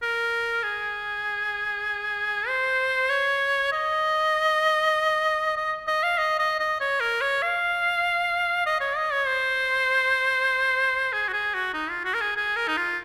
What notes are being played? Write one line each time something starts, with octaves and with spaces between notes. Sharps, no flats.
A#4
G#4
C5
C#5
D#5
D#5
D#5
F5
D#5
D#5
D#5
C#5
A#4
C#5
F5
D#5
C#5
D#5
C#5
C5
G#4
F#4
G#4
F#4
D#4
F4
F#4
A#4
G#4
G#4
A#4
D#4
F4